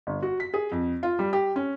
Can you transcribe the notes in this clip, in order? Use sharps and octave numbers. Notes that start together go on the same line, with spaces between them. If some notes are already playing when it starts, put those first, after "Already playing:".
G1
F#4
B6
G#4
F2
F4
G3
G4
C#4